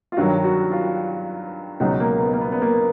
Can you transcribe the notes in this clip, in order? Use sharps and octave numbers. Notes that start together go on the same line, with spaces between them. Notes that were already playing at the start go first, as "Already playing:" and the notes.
F4
G2 D#3 F#3 F#4
F#4
F4
C#2 B2 F#3 D#4
A#3
B3
A#3
B3
B3
A#3